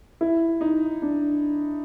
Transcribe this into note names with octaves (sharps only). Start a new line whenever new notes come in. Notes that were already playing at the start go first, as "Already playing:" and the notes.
E4
D#4
D4